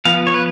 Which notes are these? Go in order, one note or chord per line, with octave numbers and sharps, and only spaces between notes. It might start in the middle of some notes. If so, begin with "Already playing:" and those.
F3 B3 F5
C#5
B4